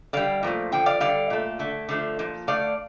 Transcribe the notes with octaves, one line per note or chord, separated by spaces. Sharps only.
D3 G3 D5 F5
A#2 F3 A3
D3 F3 G5
D5 F5
D3 G3 D5 F5
A#2 A3
D3 A3
D3 F3 A3
A#2 F3
D3 A3 D5 F5